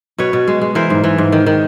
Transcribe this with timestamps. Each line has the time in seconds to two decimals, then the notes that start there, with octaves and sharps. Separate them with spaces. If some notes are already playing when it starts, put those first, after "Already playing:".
0.18 B2 B4 C#5
0.33 B2
0.47 G#3
0.61 G#3
0.75 E3 A#4 C5
0.90 G#2
1.04 E3
1.18 G#2
1.32 D#3
1.46 D#3